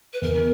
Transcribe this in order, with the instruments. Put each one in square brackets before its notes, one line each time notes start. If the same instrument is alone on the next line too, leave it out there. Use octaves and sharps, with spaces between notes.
[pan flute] B4
[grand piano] E2 [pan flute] A#4